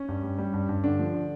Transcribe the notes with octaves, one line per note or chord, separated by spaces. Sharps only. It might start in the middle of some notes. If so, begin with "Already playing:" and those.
Already playing: C#4
G2
G3
G3
G2
G2
D3 D4
F3
D3